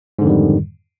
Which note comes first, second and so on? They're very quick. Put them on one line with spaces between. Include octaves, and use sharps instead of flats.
G#2 D3 F2 D#3 G3